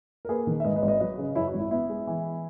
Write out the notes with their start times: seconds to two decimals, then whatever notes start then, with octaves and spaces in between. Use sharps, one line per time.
0.25 A#4
0.29 A#3 G#4 B4
0.47 D#3
0.60 E5
0.64 G#2 B4 D#5
0.76 B4 D#5
0.82 G#1
0.88 B4 D#5
1.00 F#3 B4 D#5
1.18 C#3
1.35 F#2 E4
1.47 F#4
1.53 G#1
1.59 E4
1.71 B3 E4
1.90 G#3
2.07 E3